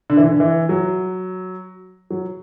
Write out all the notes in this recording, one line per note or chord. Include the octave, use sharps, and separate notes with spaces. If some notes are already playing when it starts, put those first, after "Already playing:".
D3
E3
D3
E3
F#3
F#3